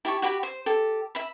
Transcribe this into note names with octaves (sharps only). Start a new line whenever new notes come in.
E4 G4 A5 C#6
F#4 G4 B5
C5
G4 A4
E5 B5